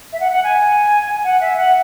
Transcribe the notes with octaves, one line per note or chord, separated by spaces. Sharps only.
E5
F#5
F#5
G#5
F#5
E5
F#5